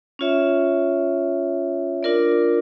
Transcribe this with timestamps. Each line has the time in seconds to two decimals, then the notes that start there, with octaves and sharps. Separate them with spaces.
0.19 C#4 F4 C#5 E5
2.03 D4 F4 A#4 D5